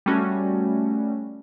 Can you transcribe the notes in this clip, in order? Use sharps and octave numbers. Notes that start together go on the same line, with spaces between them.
G3 A3 C#4 F#4